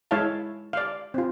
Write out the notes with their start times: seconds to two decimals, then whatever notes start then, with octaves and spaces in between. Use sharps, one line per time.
0.11 G#3 E4 C#5 E5 F5 A5
0.73 D5 F5
1.14 C4 F4